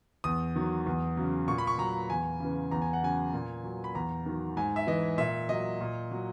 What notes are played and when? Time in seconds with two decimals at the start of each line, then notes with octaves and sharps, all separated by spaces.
0.24 E2 D#6
0.56 D#3 F#3
0.87 E2
1.17 C#3 F#3
1.48 A#2 C#6
1.58 B5
1.67 C#6
1.78 F#3 A#5
2.10 E2 G#5
2.40 C#3 E3
2.71 E2 A#5
2.82 G#5
2.93 F#5
3.03 C#3 F#3 G#5
3.33 A#2
3.64 F#3
3.84 B5
3.95 E2 A#5
4.26 D#3 F#3
4.57 G#2 G#5
4.76 E5
4.87 E3 D#5
5.18 A#2 E5
5.49 F#3 D#5
5.81 A#2
6.11 F#3